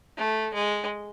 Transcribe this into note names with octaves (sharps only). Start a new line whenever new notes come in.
A3
G#3